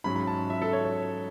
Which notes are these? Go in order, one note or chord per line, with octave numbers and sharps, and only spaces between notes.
G#2 F#3 C#4 B5
B5
A5
E5
A4
C#5
C#5